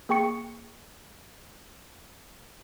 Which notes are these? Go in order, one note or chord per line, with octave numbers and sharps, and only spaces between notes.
A#3 G#4 G5 C#6 C#7